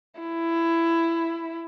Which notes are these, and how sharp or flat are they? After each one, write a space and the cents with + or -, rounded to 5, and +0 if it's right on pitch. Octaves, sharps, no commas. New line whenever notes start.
E4 +15